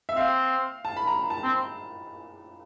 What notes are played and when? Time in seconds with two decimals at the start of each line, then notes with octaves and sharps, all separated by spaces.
0.09 E5
0.16 C4 F5
0.85 A5
0.96 B5
1.07 A#5
1.30 A5
1.43 C4